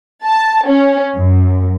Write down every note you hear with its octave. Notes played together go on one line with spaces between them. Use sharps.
A5
C#4
F#2